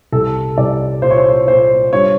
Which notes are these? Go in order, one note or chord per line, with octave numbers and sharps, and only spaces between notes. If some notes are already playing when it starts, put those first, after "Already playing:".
C2 A4
C2 D5
A#2 C5
C#5
C5
A#2 C5
G2 C#5